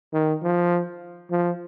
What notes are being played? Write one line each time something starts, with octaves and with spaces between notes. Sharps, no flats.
D#3
F3
F3